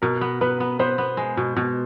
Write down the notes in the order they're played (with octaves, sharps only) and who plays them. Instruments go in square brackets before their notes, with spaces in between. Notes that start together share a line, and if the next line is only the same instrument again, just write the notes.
[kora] B2 [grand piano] A#4
[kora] B3
[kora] B3 [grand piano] B4
[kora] B3
[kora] B3 [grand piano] C5
[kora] B3
G#3
B2
B2